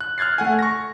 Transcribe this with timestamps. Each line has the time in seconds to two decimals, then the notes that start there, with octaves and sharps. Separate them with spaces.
0.01 F#6
0.18 F6 F#6 G#6 A6 C7
0.38 A3 F#5 G#5
0.59 C#6 A#6